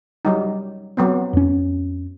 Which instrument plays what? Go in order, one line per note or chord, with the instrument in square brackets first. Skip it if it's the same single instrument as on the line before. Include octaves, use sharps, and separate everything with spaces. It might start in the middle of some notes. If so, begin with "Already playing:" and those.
[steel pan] F#3 G3 D#4
F#3 B3 C4
[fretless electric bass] F2 C#4